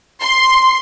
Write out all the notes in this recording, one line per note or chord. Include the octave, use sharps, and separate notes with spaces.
C6